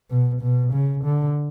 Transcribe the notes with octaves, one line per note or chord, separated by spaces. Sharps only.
B2
B2
C#3
D3